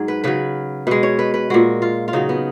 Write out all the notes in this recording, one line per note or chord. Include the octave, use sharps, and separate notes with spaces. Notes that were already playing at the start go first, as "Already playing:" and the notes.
Already playing: G#2 F#3 G#4
B4
C#3 F#3 B4
B2 G#3 B4
C#5
B4
B4
A#2 G#3 F#4
F4
F4
C#3 F#3 D#4
B3